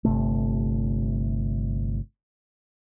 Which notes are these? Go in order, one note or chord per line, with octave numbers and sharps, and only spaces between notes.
G1 C3 A3